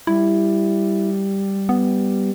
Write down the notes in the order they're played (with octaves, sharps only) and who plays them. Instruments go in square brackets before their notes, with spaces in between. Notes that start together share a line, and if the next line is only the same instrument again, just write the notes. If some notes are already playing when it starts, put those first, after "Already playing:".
[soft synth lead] G3 [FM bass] E4
[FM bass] B3